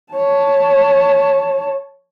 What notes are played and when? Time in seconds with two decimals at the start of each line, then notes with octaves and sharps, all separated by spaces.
0.13 C#5 A5